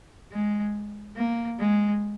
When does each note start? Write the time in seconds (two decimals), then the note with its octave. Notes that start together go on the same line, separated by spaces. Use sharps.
0.32 G#3
1.16 A#3
1.59 G#3